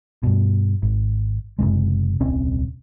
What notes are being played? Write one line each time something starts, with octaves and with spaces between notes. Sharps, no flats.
G2 B2
G#1
F#1 C#2 C3 G#3
D#1 C2 C4 C#4